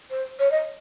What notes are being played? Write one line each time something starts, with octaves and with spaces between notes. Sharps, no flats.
C5
C#5
D#5